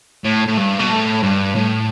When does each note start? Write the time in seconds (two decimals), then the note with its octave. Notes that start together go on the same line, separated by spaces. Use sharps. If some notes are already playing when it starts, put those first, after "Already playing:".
0.24 A2
0.47 A2
0.57 G2
0.79 B2
0.91 A2
1.23 G2
1.55 A2